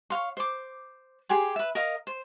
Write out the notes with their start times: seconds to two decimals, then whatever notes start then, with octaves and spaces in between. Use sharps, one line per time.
0.10 C#5 F5 C6
0.37 C5 D6
1.29 G4 G#4 G#5 C6
1.56 B4 E5
1.75 A#4 D#5 F5
2.07 C5